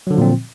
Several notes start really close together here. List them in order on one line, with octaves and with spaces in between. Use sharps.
F#3 D3 F3 A#2 C4